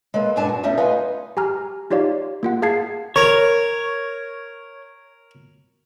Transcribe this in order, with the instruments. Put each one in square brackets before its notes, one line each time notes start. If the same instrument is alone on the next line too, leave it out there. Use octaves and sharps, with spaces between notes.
[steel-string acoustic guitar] G#3 A#3 A4 B4
G2 A#2 D4 G#5 A5
F#4
G3 A3 B3 C#4 D#4
D#4 F4 B4 D#5 F5 G#5
[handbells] G4 G#5 A#5 F6
D#4 F4 G4 C#5 D5 F5
A#3 F4 F#5
G#4 F5 A5 G#6 C7
[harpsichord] A#4 [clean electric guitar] C#5